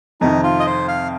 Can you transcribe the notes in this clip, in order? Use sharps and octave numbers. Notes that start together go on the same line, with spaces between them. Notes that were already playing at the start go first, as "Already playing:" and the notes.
F2 C3 D#3 D#4
F4
D#5
C5
F5